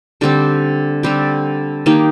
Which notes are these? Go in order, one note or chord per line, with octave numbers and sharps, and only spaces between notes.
D3 G3 C4 G4
D3 G3 C4 G4
D#3 A#3 D#4 G4